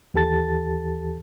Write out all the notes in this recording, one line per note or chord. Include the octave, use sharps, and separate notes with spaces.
D#2 E3 G4 A4 A5 A6